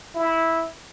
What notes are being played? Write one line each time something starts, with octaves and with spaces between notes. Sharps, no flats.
E4